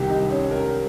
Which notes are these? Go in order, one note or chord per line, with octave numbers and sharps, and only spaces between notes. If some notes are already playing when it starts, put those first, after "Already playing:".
Already playing: C2 C3 D#3 G4
D#4
C#4
A#4